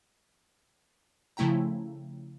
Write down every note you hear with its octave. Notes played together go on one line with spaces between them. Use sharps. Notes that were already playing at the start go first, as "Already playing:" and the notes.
C#3 F3 A3 E4 G5 A#5